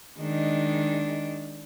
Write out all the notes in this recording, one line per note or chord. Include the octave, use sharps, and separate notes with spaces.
D#3 G#3 D4